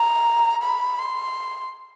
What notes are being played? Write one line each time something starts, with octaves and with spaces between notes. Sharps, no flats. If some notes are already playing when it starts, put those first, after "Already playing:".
Already playing: A#5
B5
C6